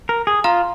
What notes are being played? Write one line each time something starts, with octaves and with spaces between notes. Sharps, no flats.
A#4
G#4
F4 F5 A#5 F6